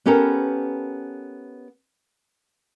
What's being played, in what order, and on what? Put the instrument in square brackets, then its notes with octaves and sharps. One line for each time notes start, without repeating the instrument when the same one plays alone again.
[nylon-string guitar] B3 C#4 G4 A4 A#4